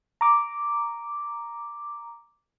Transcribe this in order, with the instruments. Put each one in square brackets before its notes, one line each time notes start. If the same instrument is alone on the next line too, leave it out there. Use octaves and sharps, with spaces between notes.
[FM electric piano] A#5 D6